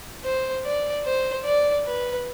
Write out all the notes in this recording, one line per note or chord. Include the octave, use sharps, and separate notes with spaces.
C5
D5
C5
D5
B4